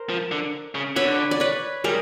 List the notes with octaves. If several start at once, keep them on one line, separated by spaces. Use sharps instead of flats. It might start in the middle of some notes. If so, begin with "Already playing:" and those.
Already playing: A#4 C5
F3
D3
C#3
D3 B4 C#5
D5
B4 C#5
G3 G#4 A#4